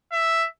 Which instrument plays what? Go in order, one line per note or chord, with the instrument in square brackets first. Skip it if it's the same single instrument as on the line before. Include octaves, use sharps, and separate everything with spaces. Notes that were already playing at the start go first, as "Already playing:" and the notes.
[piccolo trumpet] E5